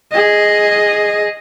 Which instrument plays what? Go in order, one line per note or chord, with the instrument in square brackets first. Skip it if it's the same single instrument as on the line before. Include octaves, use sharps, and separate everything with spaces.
[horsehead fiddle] G#4 D#5